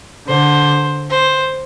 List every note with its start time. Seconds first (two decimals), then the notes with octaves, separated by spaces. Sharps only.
0.28 D3 C5
1.10 C5